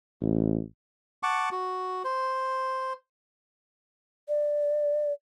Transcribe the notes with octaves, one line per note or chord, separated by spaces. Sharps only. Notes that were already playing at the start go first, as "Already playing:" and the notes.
A1
F#5 A5 C#6 D6
F#4
C5
D5